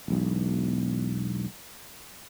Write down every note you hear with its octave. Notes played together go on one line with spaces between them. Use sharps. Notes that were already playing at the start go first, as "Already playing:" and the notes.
E1 B1